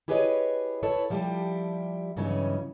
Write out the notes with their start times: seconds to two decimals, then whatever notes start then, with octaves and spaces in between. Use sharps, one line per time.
0.08 E4 G4 G#4 B4 C#5 D#5
0.83 E4 A4 B4 C#5
1.10 F3 G3 E4 G4
2.17 G2 C#3 E3 F#3 C#4 D#4